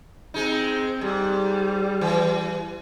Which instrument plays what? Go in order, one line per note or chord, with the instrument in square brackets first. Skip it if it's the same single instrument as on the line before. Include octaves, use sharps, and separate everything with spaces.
[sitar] G#3 D#4 [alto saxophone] C4
[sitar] G#2 [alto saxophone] G3
[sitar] E3